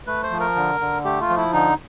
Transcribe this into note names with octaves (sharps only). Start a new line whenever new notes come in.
A3 B4
C5
F3
A#4
D3
D3
A3 G4
F4
F3
E4
D3 D#4